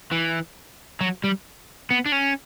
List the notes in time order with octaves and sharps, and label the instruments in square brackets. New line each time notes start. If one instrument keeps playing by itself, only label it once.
[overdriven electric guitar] E3
F#3
G3
B3
D4
C#4